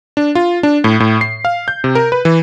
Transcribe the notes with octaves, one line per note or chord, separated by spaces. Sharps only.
D4
F4
D4
A2
A2
C7
F5
G6
C3
A#4
B4
E3